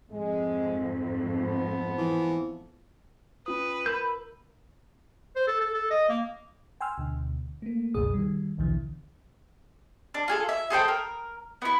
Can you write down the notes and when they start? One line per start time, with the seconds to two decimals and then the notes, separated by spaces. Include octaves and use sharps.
0.11 F2 G#2 G#3
1.32 F3 B3
1.98 E3
3.46 C#4 F4 B4 D#6
3.86 A#4 B5 E6 G6
5.36 C5
5.47 A4
5.61 A4
5.74 A4
5.91 D#5
6.09 A#3
6.81 G5 G#5 C6 E6 F6
6.98 D2 B2 D3
7.62 A3 A#3
7.94 G1 C#2 F#2 B2 G#4 D#6
8.14 D#3 G3
8.58 A#1 D#2 B2 D3 E3
10.14 D4
10.28 F4 G#4 A4
10.49 E5
10.70 G#4 A4 C5 G5
10.88 A#4
11.62 B3 E4